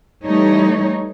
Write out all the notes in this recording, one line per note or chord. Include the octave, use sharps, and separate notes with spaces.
E3 G3 A3 D#4 C#5